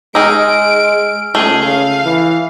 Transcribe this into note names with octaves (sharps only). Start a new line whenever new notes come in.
G#3 D#4 G#4 E6 F6 D7
C#2 A3 G#4
C#3 F5
E3